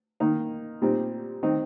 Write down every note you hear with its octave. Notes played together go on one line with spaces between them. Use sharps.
D#3 A#3 D#4
A#2 G3 C4 D#4
D#3 C4 D#4